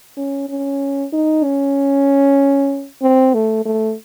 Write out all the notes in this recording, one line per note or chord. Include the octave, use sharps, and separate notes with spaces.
C#4
C#4
D#4
C#4
C4
A3
A3